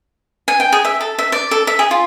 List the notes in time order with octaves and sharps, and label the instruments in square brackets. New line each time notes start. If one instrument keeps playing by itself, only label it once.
[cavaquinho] G#5
G5
G#4
E5
A4
E5
D5
A4
E5
G#4
F4